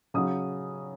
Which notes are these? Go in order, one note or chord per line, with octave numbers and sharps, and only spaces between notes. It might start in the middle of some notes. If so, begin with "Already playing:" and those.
C#3 F#3 C#4 D#6